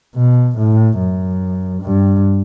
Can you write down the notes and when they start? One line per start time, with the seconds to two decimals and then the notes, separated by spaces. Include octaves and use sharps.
0.15 B2
0.58 A2
0.99 F#2
1.83 G2